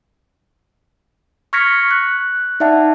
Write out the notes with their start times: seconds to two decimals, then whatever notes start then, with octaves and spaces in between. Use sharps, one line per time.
1.53 C#6 F6 G#6 A#6 B6 C#7
1.91 F#6
2.60 D#4 D5 E5 F#5 A5